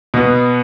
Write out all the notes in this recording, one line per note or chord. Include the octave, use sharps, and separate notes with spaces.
B2 B3